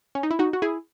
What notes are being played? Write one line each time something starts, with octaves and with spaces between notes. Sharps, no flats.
C#4
D#4
E4
D#4 F#4
F#4
E4 G#4